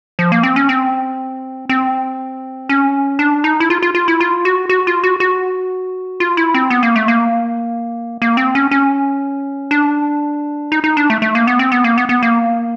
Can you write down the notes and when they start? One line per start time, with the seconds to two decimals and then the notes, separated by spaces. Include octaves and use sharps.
0.19 F3
0.32 A#3
0.43 C4
0.56 C#4
0.69 C4
1.69 C4
2.69 C#4
3.19 D4
3.44 D#4
3.60 E4
3.70 F4
3.82 F4
3.95 F4
4.08 E4
4.20 F4
4.45 F#4
4.69 F#4
4.87 F4
5.04 F#4
5.20 F#4
6.20 F4
6.37 E4
6.54 C4
6.70 B3
6.83 A#3
6.96 A3
7.08 A#3
8.22 A#3
8.37 C4
8.55 C#4
8.71 C#4
9.71 D4
10.72 D#4
10.84 D#4
10.97 D4
11.10 A3
11.22 A3
11.35 A#3
11.47 B3
11.59 C4
11.72 B3
11.84 A#3
11.98 B3
12.09 B3
12.23 A#3